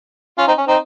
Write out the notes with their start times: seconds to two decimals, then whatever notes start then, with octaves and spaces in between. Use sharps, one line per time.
0.38 C#4 F4
0.47 C4 D#4
0.58 C#4
0.67 C4 D#4